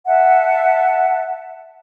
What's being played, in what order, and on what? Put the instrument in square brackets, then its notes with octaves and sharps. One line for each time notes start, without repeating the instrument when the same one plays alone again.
[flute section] E5 F#5 A5